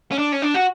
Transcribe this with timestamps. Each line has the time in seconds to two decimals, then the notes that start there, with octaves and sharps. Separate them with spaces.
0.11 C#4
0.18 D4
0.32 C#4
0.42 D4
0.54 F#4